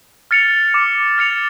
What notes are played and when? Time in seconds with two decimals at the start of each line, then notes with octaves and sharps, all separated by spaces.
0.31 F6 A6 C#7 F7
0.74 D6
1.18 F6 A6 C#7 F7